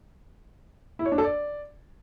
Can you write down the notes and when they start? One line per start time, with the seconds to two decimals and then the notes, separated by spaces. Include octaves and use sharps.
0.99 E4
1.06 C#5
1.12 D4
1.18 A4
1.24 D5